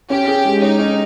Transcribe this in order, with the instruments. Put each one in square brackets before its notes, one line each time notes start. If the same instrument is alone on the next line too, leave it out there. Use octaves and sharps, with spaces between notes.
[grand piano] C#4 [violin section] G4
[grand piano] G#4
G#3
[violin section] D#4 [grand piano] C#5
[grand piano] C#4